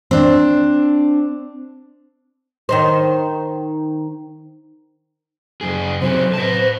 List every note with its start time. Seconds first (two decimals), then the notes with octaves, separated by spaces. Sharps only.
0.11 C4 D4
2.69 D#3 D#4 C5
5.61 F#2 G#4
6.01 C3 F#3 C5
6.34 B4 A5